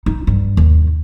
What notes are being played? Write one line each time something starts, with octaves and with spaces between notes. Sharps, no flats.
D#4
G2
D#2